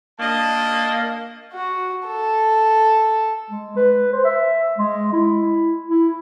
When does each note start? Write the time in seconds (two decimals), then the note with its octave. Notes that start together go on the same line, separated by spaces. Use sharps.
0.19 A#3 D4 D#5 A5
1.53 F#4
2.07 A4
3.50 G#3
3.77 B4
4.13 C5
4.25 E5
4.79 G#3
5.13 E4
5.88 E4